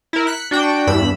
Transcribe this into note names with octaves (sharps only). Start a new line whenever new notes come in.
E4 A#4
F#6 B6 C#7
D4 F#4 F#5 G5
E2 G2 B5 E6